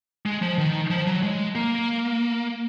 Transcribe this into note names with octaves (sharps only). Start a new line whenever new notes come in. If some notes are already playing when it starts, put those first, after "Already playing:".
G#3
F3
D#3
F3
F#3
G#3
A#3